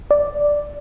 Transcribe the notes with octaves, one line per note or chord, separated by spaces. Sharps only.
D5